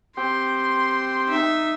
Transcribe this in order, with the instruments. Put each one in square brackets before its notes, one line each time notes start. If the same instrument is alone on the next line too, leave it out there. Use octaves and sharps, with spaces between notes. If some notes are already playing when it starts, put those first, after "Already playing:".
[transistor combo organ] C4 G4 [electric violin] C6
[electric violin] D#4 E5